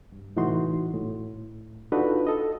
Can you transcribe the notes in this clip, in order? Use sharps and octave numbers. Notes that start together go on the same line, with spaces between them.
G2
C2 A2 E3 D#4 F#4 C6
A2
D4 D#4 F4 F#4 A4 B4
A4 D#5